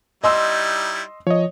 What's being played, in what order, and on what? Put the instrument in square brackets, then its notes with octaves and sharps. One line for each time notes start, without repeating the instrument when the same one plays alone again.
[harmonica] G3 D#4 E4 [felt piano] D#5 C6 E6
[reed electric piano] F3 [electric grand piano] C#5 D#5